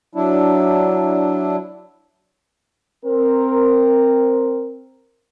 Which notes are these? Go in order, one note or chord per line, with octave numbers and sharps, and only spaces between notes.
F#3 D4 E4
C4 A#4